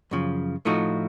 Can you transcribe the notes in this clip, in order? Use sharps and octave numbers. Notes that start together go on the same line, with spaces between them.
F#2 C#3 F3
A2 F3 A3 D#4 F#4